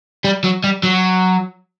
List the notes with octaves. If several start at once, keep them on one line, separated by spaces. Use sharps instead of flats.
G3
F#3
G3
F#3